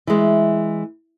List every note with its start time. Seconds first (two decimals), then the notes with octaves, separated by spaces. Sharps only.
0.07 E3 G#3